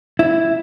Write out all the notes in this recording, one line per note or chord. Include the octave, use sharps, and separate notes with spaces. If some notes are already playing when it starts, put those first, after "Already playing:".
E4